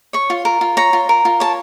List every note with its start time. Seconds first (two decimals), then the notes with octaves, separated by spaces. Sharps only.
0.13 C#5 C#6
0.30 F4
0.45 A#4
0.61 F4
0.77 C#5 A#5
0.93 F4
1.09 A#4
1.25 F4
1.40 C#5 A5